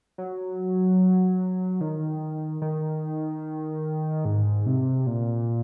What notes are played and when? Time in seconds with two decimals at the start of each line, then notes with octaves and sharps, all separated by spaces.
0.18 F#3
1.81 D#3
2.62 D#3
4.25 G#2
4.66 C3
5.07 A#2